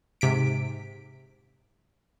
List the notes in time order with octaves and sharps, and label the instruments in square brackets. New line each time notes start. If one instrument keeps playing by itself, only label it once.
[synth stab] G#2 C3 B6 D7